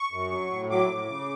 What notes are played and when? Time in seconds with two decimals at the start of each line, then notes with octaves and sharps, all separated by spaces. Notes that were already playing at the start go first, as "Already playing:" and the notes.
Already playing: C#6
0.12 F#2
0.32 F#3
0.51 A2
0.70 F#3 D6
0.90 A2
1.09 C#3